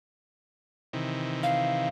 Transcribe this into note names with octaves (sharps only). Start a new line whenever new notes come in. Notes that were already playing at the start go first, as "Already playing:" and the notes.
C3 D#3 E3
F5